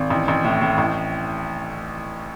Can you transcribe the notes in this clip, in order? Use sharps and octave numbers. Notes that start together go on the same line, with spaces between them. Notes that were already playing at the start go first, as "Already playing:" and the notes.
Already playing: G#1
A1
A1
A2
A2
A1